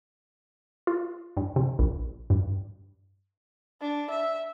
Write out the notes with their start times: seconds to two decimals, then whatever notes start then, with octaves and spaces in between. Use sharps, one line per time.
0.87 F4
1.37 G2
1.56 C3
1.79 A#1
2.30 G2
3.81 D4
4.10 E5